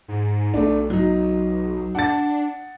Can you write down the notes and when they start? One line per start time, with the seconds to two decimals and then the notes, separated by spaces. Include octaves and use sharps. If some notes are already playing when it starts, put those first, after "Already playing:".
0.08 G#2
0.54 B1 A3 D4
0.90 F#3 D#4
1.95 D4 F#5 A6